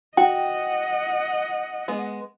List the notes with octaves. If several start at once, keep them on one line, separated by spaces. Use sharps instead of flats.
F#4 D#5 F#5 G5
G#3 B3